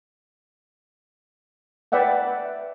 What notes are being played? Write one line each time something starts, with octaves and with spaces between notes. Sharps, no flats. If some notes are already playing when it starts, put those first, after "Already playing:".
B4 D5 E5 F#5 G5